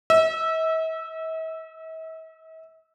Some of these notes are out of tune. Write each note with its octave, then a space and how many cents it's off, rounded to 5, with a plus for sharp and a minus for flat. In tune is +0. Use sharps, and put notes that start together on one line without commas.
E5 -45 E6 +0